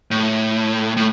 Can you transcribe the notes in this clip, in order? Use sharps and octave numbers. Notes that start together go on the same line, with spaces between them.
A2
A2